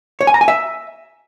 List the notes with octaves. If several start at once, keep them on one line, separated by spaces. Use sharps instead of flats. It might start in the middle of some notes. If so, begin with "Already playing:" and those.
C#5
G#5
A#5
G#5
E5